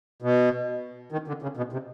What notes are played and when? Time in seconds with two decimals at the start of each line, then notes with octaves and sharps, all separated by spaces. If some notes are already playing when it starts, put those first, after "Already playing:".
0.22 B2
1.12 D#3
1.28 D3
1.42 C#3
1.57 B2
1.73 C3